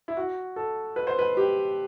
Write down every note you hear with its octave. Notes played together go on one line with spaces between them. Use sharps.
E4
F#4
A4
B4
C5
B4
G4